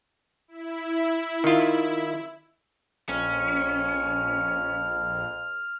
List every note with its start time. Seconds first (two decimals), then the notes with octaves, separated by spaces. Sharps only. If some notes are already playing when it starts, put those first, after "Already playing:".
0.48 E4
1.44 D#3 F4
3.09 A#1 F2 C#4 F6